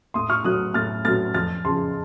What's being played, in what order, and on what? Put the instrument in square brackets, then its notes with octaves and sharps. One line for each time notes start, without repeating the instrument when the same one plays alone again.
[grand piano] A2 C6 D#6
C#6 F6
F#3 A3 D#6 F#6
A2 F6 A6
F#3 A3 F6 A6
F2 F6 A6
C#3 F3 A5 C6